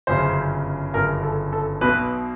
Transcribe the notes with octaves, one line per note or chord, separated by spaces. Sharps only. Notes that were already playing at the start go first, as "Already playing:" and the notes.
G1 F#2 C#3 C5
G1 F#2 C#3 A#4
A4
A4
B1 B2 B4